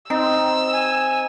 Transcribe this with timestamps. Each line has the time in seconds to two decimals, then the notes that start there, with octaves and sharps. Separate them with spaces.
0.10 C4 D#4 E6
0.73 G#5